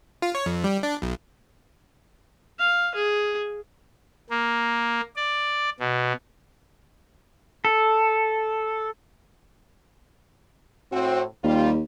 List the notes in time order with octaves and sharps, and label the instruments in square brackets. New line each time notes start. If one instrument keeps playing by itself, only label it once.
[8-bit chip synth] F4
C#5
F2
G3
D4
B1
[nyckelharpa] F5
G#4
[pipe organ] A#3
D5
B2
[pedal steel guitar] A4
[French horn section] A2 C4 F#4
[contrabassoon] D#2 [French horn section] G3 F4